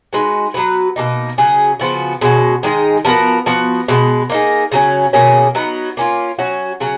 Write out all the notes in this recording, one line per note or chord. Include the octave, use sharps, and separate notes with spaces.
G#3 D#4 F#4 B4
F#3 B3 F#4 B4
B2 A#3 D#4
C#3 F#3 C#4 G#4
C#3 F3 B3 F#4
B2 G#3 C#4 F#4
D#3 G#3 D#4 G#4
F3 B3 F#4 A#4
F3 B3 F#4
B2 G#3 B3
A#3 D#4 G#4
C#3 F#3 C#4
B2 A#3 C#4 G#4
F#3 B3 D#4
A#3 C#4 F4
F#3 C#4 F#4
C#3 F#3 C#4